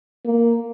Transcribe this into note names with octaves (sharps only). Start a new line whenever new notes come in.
A#3